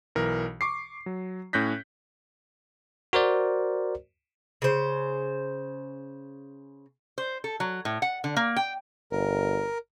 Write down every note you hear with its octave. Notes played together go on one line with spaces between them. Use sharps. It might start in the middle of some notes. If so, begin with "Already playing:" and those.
B1 E3 A#4
C#6 D6 C7
F#3
A2 C#4 F#6 G6 A#6 B6
F#4 A#4 C5 D5
C#3 C5
C5
A4
F#3
A2
F#5
D3
A#3
G5
G1 A#4